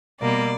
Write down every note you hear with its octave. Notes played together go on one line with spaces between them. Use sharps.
B2 G3 A#3 D5